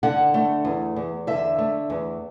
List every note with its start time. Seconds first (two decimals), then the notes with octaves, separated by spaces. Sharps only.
0.03 D3 F#5
0.34 A3
0.65 E2
0.96 E2
1.27 D3 E5
1.58 A3
1.90 E2